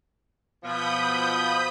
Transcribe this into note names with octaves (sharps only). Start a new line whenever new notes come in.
B2 F3 B5 D#6 G6